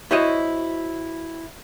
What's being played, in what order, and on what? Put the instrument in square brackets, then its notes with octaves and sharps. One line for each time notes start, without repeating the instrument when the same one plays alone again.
[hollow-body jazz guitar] E4 F#4 C5 C#5 D#5